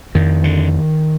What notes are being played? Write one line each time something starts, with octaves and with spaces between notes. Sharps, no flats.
F2 D#3
D3